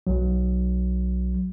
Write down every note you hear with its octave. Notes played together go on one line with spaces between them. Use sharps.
B1 F#3